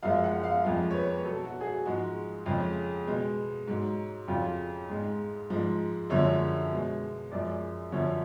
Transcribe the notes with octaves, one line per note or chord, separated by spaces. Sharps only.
F#2 F3 G#3 F5
F#5
F5
F2 F3 G#3
C#5
B4
B2 F#3 A4
F#4
G#4
F#4
G#2 F3 G#3 F#4
F2 C#3 F3 G#3
B2 G#3
G#2 F#3
F2 C#3 F#3 F4
G#2 G#3
G#2 F3 G#3
F#2 D3 F3 G#3 C#5
B2 G#3
F#2 F3 G#3 D5
F#2 D3 F3 C#5